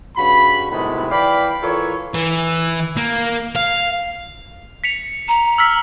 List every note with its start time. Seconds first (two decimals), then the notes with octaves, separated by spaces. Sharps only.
0.17 G2 C#3 F#4 B5
0.71 A2 C3 D#3 F#3 G#3 B3
1.10 E3 D5 F5 G5 B5
1.62 E3 F4 A4 A#4 C#5
2.14 E3
2.97 A#3
3.55 F5
4.84 B6 C#7 F7
5.28 A#5
5.58 E6 F6 B6